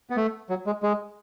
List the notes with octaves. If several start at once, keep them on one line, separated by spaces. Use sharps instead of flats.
B3
A3
F#3
G#3
G#3